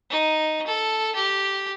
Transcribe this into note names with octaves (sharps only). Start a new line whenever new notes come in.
D#4
A4
G4